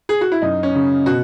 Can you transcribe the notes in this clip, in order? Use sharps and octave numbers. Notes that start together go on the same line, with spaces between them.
G#4
F#4
E4
F#2 D#4
C#4
C#3
B2 F#4